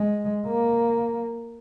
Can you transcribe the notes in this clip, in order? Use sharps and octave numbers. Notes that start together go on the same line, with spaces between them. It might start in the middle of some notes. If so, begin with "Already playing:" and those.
Already playing: G#3
A#3